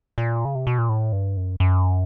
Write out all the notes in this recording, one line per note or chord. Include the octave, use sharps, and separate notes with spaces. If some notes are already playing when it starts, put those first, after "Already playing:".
A#2
C#3
C3
B2
A#2
A2
G2
F#2
F#2